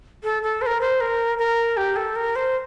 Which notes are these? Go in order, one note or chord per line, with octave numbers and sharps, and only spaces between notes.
A4
A4
C5
A#4
C5
A#4
A#4
G4
A4
A#4
C5